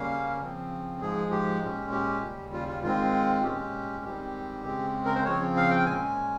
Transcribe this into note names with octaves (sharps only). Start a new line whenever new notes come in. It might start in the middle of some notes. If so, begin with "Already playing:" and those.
Already playing: C#3 G3 A#3 C#4 F5
C#3 F3 C4
G#2 F3 G#3 G#4
G4
A#2 G#3 C#4
G4
D#2 C#3 G3
F4
F4
G#2 D#3 G#3 C4 F4
A#2 G#3 C#4 G4
G#2 D#3 G3 C4 G4
C#3 G#3 C4
A#4
C5
C#3 F3 C4 C#5
F5
G5
A#2 G#3 C#4 G#5